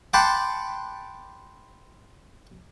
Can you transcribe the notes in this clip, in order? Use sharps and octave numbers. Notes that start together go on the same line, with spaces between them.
F#5 G5 A5 B5 C6 D6